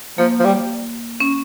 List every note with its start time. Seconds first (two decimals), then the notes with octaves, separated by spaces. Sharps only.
0.18 F3 A#3
0.39 F3
0.44 G3
1.20 C#4